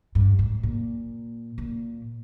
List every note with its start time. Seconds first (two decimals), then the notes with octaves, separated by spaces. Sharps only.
0.15 G2
0.39 G#2
0.63 A#2
1.58 A#2